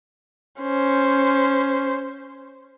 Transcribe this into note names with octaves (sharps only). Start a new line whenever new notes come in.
C#4 C5